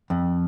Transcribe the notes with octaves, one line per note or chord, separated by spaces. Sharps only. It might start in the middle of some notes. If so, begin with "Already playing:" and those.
F2